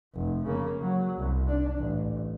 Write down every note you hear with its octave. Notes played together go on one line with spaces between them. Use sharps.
F1
C#3 A#3
F#3
C2
D4
A1